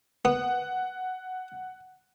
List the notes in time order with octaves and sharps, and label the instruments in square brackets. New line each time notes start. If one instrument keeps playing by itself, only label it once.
[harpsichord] B3 [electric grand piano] F#5